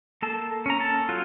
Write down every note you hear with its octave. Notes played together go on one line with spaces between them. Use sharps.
A#3 A4 A5
C#4 A#5
A4 A5
F#3 F4